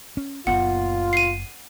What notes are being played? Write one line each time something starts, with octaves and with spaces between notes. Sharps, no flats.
C#4
F#1 A#2 B3 F4 F#5
C7 D#7